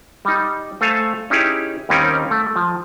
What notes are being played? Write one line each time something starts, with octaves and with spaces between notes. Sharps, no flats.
G3 D#4
A3 A4 C5 F5 G#5
C#4 D#4 E4 G4 G#4
D#2 G3 C4 C#4 D#4 A#4
A3
F3